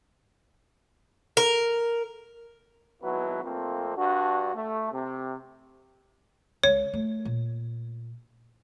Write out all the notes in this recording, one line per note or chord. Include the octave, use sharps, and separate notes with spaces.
A#4
G#1 B2 F#3 E4 B4
F2 F3 A3 A#3 C4
G2 D4 F#4
A3
C3
C#2 C#5
A3
A#2